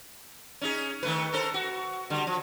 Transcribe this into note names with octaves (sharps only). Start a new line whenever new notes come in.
C#4 D#4 G#4
D#3 A3 B4
A4 A#4 C5
F#4
D3 G3
F3